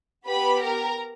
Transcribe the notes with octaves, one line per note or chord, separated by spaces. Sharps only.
B3 G4 B4 B5
A#4 A#5